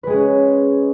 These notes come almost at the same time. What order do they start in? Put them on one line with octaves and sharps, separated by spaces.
B4 G#3 G#4 C#4